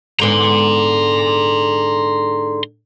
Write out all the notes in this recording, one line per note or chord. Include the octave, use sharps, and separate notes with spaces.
G#2 D3 B3 A#5 C6